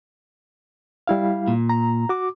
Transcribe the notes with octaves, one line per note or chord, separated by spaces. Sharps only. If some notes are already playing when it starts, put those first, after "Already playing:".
G3 E4 F5
A#2
A#5
F#4 D6